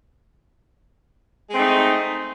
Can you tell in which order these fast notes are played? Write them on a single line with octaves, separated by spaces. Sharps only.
G#3 C4 A3 D#4